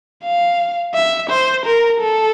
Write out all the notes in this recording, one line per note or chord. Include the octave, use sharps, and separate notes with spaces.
F5
E5
C5
A#4
A4